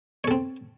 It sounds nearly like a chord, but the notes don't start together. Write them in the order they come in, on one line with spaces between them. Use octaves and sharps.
C#5 A4 C4